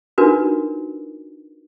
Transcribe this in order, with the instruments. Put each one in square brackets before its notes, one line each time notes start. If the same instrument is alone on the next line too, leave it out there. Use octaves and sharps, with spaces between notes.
[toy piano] D4 D#4 F4 F#4 A#4 B4